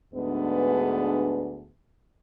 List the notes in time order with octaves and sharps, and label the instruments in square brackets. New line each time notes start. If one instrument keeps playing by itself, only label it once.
[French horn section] D2 G#2 B3 D4 G#4 B4